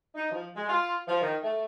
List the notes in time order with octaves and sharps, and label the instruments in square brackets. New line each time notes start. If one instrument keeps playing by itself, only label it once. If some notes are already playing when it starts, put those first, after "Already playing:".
[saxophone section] D#4
F3
G#3
F4
F3
D#3
A3